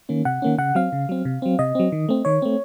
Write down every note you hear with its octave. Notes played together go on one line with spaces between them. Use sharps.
D#3 A#3 C#4
C3 F#5
D#3 A#3 C#4
C#3 F#5
F#3 C4 F5
C#3
F#3 C4
C3
F#3 C4
C3 D#5
F#3 C4
D#3
A3 C4
D#3 C#5
A3 C4